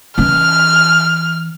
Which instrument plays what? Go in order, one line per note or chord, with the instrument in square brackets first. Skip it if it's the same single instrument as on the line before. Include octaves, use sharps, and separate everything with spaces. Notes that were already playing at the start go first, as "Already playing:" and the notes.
[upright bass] E3 C#4 [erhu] F6